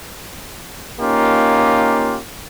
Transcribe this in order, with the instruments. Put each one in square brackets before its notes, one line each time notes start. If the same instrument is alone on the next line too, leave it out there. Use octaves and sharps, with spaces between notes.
[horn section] A#3 C#4 D#4 F4 G4